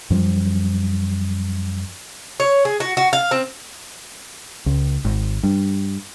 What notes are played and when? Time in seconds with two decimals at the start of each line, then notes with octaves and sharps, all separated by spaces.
0.10 F#2 F3 G3
2.40 C#5
2.65 G#4
2.80 F#4
2.97 F#4
3.13 F5
3.31 C4
4.66 C#2
5.05 G#1
5.43 G2